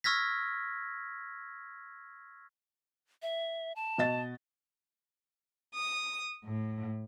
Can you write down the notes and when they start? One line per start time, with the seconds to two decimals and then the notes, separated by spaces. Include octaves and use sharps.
0.04 C#6 E6 F6 G#6 A#6 B6
3.22 E5
3.76 A5
3.98 B2 D#5 A6
5.74 D#6
6.45 A2